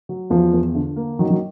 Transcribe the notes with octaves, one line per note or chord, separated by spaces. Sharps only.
F#3
E2 F3
E2
D3
A#3
D#3 F#3
F#3